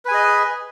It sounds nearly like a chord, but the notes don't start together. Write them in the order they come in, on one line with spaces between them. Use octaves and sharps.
B4 G#5 G#4 D#5